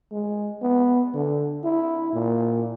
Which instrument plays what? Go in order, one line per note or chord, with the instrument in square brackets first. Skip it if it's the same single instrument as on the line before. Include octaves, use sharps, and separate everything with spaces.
[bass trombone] G#3
B3
D3
E4
A#2